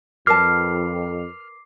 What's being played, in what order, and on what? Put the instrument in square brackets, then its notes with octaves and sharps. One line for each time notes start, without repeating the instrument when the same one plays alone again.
[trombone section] F2 [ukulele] A#4 B4 A5 [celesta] D6 C7 [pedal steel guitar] F6